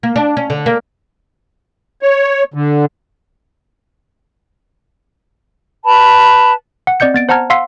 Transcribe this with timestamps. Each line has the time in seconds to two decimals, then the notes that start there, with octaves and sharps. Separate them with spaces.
0.03 A#3
0.16 D4
0.37 C#4
0.50 D3
0.66 A#3
2.02 C#5
2.54 D3
5.84 B4 A5 B5
6.87 F#5
7.00 C4 D5 D#5 G6 C#7
7.14 B3 A6 D7
7.29 C5 F#5 A5 A#5 F6 G#6
7.50 F5 F#5 C6 E6 B6 C7